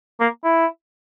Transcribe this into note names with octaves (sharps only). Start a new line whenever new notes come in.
A#3
E4